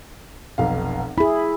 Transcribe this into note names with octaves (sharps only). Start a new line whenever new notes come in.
F1 B1 F5
E4 G#4 B5